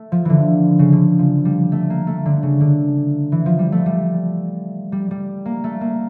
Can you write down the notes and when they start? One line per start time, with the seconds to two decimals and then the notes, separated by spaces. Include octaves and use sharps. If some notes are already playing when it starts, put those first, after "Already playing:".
Already playing: A3
0.12 F3
0.25 D3 E3
0.79 C#3
0.92 D3
1.19 F3
1.45 G3
1.72 A3
1.90 A#3
2.07 A3
2.26 D3
2.43 C#3
2.61 D3
3.32 E3
3.46 F3
3.59 G3
3.72 A3
3.86 G3
4.92 G3
5.11 G3
5.45 A#3
5.64 A3
5.81 A#3